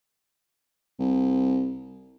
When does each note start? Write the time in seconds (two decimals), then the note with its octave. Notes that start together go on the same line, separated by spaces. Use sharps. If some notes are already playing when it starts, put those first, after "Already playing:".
0.99 C2